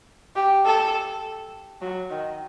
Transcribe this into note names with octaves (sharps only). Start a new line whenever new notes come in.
G4
A4
F#3
D#3